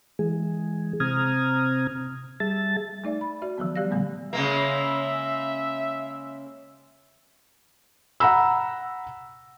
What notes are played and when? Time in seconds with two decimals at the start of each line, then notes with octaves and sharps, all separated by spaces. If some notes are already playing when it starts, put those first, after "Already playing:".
0.19 E3 G#3 G#4
1.00 C3 C4 A#5 D#6 F6 G#6
2.40 G3 G#4 E5 A5 A6
3.04 A3 D#4 D5 E5
3.21 B5
3.42 F#4 D5 E5
3.58 D#3 F3 F#3 B3
3.76 G3 G4 D5 F5 A#6
3.91 A#2 D3 G3 A3 B3
4.33 C#3 G#3 A#3 E5
8.20 F#5 A#5 B5 E6